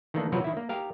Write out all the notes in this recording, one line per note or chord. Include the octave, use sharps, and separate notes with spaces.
D#3 E3 A3 A#3 D4
C3 F3 F#3 F#4 A#4 B4
D#3 E4
A#3
G4 A#4 F5